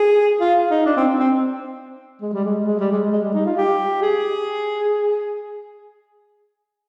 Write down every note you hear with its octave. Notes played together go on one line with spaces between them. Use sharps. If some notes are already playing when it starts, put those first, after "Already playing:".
Already playing: G#4
F4
D#4
D4
C4
C4
G#3
G3
G#3
G#3
G3
G#3
G#3
G3
D#4
F4
G4
G#4